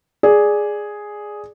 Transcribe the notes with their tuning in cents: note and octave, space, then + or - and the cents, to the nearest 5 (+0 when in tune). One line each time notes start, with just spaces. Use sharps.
G#4 +0 D5 +0